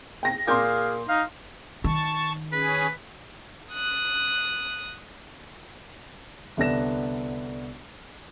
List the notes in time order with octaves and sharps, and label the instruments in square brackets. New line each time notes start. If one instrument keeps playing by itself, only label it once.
[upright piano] G5 A#6
[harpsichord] A#2 [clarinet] G#4 [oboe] F5 [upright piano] C6 D6 G6
[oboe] D#4 [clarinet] F5
[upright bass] D#3 [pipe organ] A5 C#6
[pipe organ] C#4 G#4 [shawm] B4
[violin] D#6 F#6
[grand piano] C2 D3 B3 D4 A#6 E7